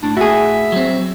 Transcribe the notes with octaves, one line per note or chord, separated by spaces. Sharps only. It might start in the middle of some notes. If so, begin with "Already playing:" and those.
A2 D4
F#4 G#4 E5
F#3 C4